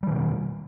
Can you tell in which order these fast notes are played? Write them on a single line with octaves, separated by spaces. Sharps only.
G3 D#3 B2